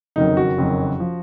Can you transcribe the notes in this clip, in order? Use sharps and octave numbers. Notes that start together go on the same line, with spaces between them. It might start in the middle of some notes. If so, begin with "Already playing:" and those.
F#1 F2 D#3 F#3 D#4
F#4
F#1 F2 D#3 F#3
F3